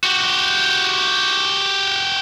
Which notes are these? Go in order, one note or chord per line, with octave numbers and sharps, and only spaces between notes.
F#4 G4